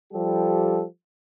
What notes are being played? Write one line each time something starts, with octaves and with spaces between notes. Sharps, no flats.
F3 G3 G4 A4